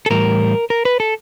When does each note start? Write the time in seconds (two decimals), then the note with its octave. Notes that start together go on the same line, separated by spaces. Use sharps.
0.06 A4
0.10 A2 E3 G3 A#4
0.70 A#4
0.85 B4
1.00 A4